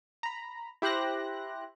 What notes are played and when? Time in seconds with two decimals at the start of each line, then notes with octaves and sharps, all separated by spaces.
0.23 A#5 B5
0.82 E4 G4 C5 F#6 A#6